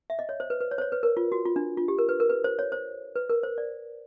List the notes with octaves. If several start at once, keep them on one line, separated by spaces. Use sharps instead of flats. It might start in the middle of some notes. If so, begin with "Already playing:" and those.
E5
D#5
C#5
C5
B4
B4
C#5
C5
C#5
B4
A#4
F4
F#4
F4
D4
F4
G4
A#4
B4
A#4
B4
C5
C#5
C5
B4
A#4
C5
D5